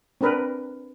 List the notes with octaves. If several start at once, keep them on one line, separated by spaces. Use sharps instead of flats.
C4 D4 A#4 B4